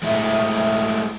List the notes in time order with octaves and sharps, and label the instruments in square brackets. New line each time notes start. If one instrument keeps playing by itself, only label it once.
[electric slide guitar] G#3 A3 E4